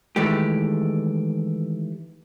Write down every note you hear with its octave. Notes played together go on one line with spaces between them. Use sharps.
D#3 E3 G#3 A3 G4